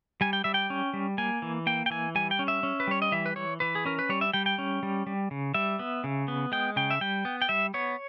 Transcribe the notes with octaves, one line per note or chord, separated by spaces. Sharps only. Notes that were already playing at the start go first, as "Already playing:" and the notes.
G3 G#5
G5
G3 E5
G5
C#4
G3
A#3 G#5
E3
A#3 G5
G5
E3 G#5
G3 G#5
G5
C#4
E5
C#4
B4
G3 C#5
D#5
E3 E5
B4
E3 C#5
E3 B4
G#4
C#4 A#4
B4
G3 C#5
E5
G3 G5
G5
C#4
G3
G3
C#3
G3 E5
B3
C#3
B3
G#3 G5
C#3 G5
E5
G3 G5
B3
G5
G3 E5
B3 C#5